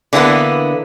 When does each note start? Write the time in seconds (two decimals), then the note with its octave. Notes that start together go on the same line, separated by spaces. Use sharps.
0.13 D3 E3 A#3 B3